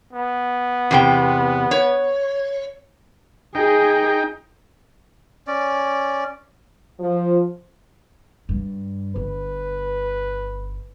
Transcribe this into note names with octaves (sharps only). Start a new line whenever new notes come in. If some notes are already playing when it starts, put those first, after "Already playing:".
B3
E2 C3 G5
C#5
D#4 G#4 G5
C#4 D5
F3
G2
G1 B4